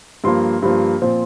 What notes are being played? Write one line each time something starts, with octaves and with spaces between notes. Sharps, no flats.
G2 F3 A#3 C6
G2 F3 A#3
A#2 F3 C4